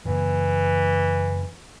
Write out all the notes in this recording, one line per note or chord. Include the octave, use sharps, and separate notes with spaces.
F#2 C#3 E3 A#3